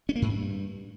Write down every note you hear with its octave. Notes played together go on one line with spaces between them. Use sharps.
C#4
A#3
G#2
G2